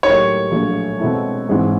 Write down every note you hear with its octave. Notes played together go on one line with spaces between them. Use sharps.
A2 F#3 A#3 D#4 G4 C#5
A#1 A#2 F#3 A3
B2 G#3 C4 E4 A4
G#2 E3 G#3 C4 E4